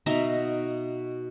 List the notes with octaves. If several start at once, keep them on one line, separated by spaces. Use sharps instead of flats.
B2 D#4 E5 A#5